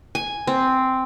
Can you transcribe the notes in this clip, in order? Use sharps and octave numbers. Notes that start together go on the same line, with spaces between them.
G#5
C4